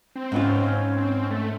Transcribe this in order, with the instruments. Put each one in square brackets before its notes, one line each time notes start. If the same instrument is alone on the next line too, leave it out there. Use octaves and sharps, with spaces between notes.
[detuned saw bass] C4
[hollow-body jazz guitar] G#2 B3 F4 [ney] C#4
[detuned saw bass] C4
A3